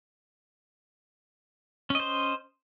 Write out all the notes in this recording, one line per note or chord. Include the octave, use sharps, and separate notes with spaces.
C#4 C5 D#5